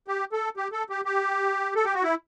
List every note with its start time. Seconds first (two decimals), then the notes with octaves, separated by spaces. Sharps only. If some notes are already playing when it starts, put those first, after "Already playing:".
0.08 G4
0.32 A4
0.57 G4
0.72 A4
0.90 G4
1.05 G4
1.76 A4
1.85 G4
1.94 F#4
2.03 E4